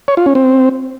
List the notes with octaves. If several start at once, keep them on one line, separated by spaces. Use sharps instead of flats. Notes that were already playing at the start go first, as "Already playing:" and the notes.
C#5
F4
C#4
C4